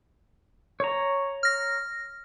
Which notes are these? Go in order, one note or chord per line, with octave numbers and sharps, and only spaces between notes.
C#5 A#5
F6 A#6